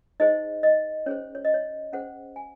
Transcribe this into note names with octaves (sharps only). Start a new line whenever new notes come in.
D#4 G#4 C5 D#5
D#5
C#4 G#4 C5 C#5
C#5
D#5
C#5
C#4 G#4 C5 F#5
G#5